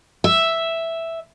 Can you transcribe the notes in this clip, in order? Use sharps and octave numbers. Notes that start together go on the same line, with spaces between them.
E5